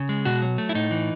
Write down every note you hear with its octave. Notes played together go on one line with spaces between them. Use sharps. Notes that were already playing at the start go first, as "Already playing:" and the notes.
Already playing: C#3
G#3
B2 F#4
F#3
A3
E4
A2 D#4
E3